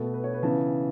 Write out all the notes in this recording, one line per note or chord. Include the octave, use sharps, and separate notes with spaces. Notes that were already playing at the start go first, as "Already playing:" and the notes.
Already playing: B2 A3 A4
B4
C#5
B4
C#3 E3 B3 A5